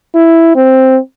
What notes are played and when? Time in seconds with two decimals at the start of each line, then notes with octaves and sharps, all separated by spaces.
0.15 E4
0.56 C4